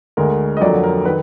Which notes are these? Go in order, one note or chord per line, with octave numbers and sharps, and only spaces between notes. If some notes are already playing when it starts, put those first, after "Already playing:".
D2 D3 G#3 A#4
D#5
F2 D3 F#3 A#3 D5
A#4
D#3 B4